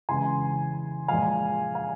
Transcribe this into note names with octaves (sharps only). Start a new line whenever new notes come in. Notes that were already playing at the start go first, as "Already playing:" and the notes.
C#3 E3 G#3 G#5 C6
A#2 F3 G#3 F5 G#5
F5 G#5